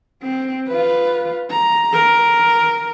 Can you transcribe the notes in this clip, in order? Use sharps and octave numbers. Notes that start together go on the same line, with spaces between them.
C4
F4 B4
A#5
A#4